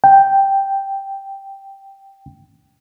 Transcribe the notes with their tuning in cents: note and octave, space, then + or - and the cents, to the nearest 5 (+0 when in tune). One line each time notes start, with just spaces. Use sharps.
G5 +0